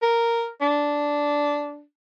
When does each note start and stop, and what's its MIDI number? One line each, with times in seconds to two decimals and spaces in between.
0.03 0.49 70
0.61 1.82 62